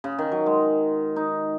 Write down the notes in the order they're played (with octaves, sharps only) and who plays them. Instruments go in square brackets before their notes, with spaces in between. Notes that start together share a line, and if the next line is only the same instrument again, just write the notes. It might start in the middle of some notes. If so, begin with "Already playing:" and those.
[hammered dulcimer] C#3
D#3
F#3
G#3
D#4